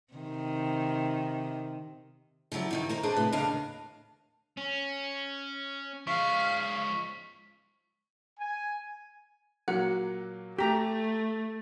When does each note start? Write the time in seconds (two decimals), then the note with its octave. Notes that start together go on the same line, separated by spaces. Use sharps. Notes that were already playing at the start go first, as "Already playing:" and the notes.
0.13 C3 D#3
2.52 C#3 F3 F#3 E4 D5
2.71 G2 D#3 D#4
2.89 A#3 D#4 C5
3.03 D4 G#4 B4 C5 D5
3.16 A2 C3 B4
3.32 D#2 C#3 D4 D#5 F5
4.57 C#4
6.07 F3 G#3 F5 C#6 B6
8.40 G#5
9.68 A#2 F#3 A#3 F#5
10.59 A3 G4 A#5 B6